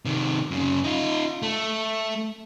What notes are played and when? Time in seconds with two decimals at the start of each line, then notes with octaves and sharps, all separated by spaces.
0.05 C3 D#3
0.51 F#2 C#3
0.84 D#4 F4
1.42 A3